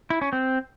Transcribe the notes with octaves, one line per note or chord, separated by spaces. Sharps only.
E4
C#4
C4